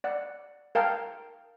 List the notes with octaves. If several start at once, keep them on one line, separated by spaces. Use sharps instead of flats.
D5 F#5
A#4 F5 G5 A5